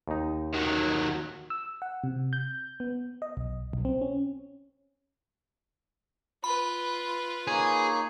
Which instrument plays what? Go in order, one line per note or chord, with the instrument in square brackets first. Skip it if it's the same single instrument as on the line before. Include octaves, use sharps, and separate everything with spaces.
[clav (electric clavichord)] D#2 D#4
[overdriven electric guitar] D#3 F#3
[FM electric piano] E6
F#5
C3
G6
B3
D#5
B1
B1
C4
C#4
[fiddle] F4 B4 [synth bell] B5
[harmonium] A#3 D#4 C#5 [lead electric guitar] G#4